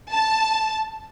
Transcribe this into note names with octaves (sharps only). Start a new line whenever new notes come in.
A5